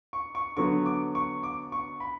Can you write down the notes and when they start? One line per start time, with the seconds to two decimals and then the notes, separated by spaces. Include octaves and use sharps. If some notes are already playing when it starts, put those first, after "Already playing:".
0.13 C#6
0.35 C#6
0.57 D3 F#3 B3 C#6
0.86 D6
1.15 C#6
1.43 D6
1.72 C#6
2.00 B5